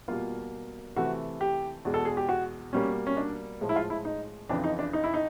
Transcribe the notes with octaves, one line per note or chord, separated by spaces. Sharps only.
B2 G3 A#3 F4
C3 E3 A3 F#4
G4
E2 B2 G#3
A4
G#4
G4
F#4
B2 G3 A#3 C#4
C#4
D4
A2 F3 G#3
E4
F4
E4
D#4
F2 C#3 E3 D4
D#4
D4
D#4
E4
D#4